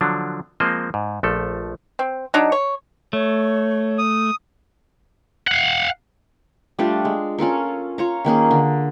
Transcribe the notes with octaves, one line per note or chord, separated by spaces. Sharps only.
D3 F3 F#3 D4
F3 G#3 A#3 C4 C5 D#5
G#2
A#1 F3 A3 A4
C4
F#3 D4 D#4
C#5
A3 C#5
D#6
F5 F#5
G3 A3 D4 F4
G#3
C#4 F4 A4 A#4
F4 C#5 A#5
D#3 A#3 C#4 G#4
D3